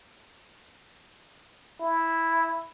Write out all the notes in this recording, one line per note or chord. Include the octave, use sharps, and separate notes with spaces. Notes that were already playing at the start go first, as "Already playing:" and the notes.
E4